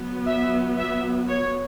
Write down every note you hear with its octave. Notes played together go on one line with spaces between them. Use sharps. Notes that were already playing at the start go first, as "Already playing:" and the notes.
Already playing: F#3 B3
E5
E5
C#5